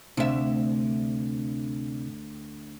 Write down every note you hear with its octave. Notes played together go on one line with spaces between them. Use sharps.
D2 C3 C4 D4 E5